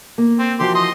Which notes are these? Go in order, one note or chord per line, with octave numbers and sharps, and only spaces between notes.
A#3
C4
E3 F3 F#4 G4 C6
D#5 C6